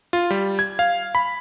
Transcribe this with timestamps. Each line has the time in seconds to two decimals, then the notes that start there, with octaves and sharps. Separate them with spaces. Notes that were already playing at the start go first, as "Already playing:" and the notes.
0.13 F4
0.30 G3
0.59 G#6
0.79 F5
1.15 B5